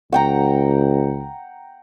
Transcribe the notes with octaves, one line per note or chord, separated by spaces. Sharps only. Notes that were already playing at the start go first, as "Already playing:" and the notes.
C#2 F#5 G5 A#5